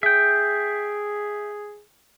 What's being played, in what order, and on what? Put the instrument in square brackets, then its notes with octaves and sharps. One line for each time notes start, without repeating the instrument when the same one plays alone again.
[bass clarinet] G#4 [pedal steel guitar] E5 G5